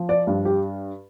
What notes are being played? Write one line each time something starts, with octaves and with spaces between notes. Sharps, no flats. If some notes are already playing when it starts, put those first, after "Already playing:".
Already playing: F3
D5
G2
G4